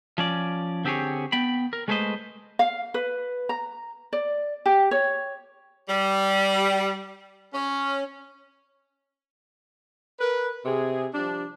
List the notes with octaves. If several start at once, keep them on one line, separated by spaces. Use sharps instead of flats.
F3 C#4 D5
D3 C4 G4 G#4 C#5
B3 G5 B5
A#4
G#3 A3 B3 B4 C5 D#5
F5
B4
A#5
D5
G4
C#5
G3
C#4
A#4 B4
C3 G#4
F3 G3 D4